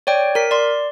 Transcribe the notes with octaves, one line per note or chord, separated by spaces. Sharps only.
C#5 D5 G5
A#4 B6
D5 C6